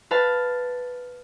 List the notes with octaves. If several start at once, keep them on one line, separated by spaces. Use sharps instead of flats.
B4 F5 A5